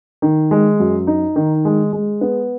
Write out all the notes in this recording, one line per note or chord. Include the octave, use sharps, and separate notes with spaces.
D#3
G#3
F#2
D#4
D#3
G#3
G#3
B3